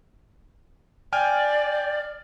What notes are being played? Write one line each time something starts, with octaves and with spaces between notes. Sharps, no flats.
D5 G5 G#5 F6